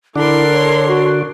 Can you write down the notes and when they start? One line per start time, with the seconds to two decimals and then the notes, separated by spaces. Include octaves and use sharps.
0.16 D3 D4 E4 A4 A#4 C6
0.52 C#5
0.88 F#4